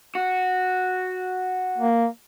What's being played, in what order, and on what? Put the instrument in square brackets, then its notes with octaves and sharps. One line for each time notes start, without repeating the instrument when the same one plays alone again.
[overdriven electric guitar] F#4
[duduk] A#3